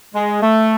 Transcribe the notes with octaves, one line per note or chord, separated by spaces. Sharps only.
G#3
A3